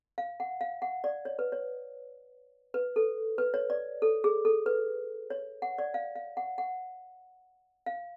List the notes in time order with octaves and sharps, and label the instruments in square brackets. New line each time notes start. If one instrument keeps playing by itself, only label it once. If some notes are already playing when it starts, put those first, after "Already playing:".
[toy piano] F5
F#5
F5
F#5
D5
C#5
B4
C#5
B4
A4
B4
C#5
D5
A4
G#4
A4
B4
C#5
F#5
D5
F5
F5
F#5
F#5
F5